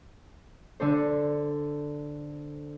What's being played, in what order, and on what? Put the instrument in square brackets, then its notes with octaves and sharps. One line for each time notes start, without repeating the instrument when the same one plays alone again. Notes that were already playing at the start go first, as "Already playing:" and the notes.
[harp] D3 D4 A4 C5